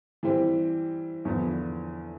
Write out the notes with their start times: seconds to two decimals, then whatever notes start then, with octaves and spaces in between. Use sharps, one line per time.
0.23 E3 G3 C4 G4
1.25 E2 D3 F3 B3 F4